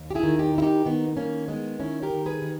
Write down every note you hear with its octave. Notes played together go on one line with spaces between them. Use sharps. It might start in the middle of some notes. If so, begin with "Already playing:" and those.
Already playing: D#2
G4
E4 G#4
D#3
D#4 G4
D#3 E4
D#4 G4
D#3 B3 D#4
B3
D#3 A#3 C#4
D#3 G#3 B3
D#3 C#4 E4
G4 A#4
D#3
G#4 B4
D#3